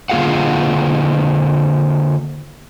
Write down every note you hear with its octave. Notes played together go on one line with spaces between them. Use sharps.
D3 A#3 F4 G#4 F5 F#5